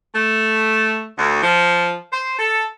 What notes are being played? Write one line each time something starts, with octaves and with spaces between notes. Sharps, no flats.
A3
D2
F3
C5
A4